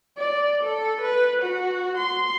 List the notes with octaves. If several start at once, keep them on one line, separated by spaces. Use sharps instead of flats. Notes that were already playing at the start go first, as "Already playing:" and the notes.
D5
A4
B4
F#4
C6